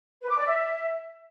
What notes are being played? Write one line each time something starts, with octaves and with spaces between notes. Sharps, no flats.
B4
D6
D5
E5